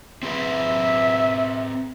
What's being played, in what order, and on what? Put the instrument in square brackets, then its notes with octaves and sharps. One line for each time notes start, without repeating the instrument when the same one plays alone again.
[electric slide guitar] C4 G#4 B4 [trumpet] E5